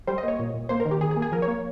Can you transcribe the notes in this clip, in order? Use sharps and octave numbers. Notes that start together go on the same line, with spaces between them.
G3 C5
D#5
A#3
C#5
A#2
A#2
A#3 C5
A#4
D#3
G4
D#3 G#4
G#4
A#3
G#4
F3 A#4
C#5
A#3